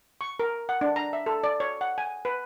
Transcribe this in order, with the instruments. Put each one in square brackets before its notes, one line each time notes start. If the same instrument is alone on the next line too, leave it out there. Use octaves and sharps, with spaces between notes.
[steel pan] C#6
A#4
F#5
D4
A#5
E5
A4
D5
C#5
F#5
G#5
B4